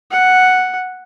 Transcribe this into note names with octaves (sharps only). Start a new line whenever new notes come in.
F#5